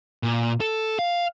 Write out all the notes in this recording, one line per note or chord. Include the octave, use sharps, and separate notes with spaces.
A#2
A4
F5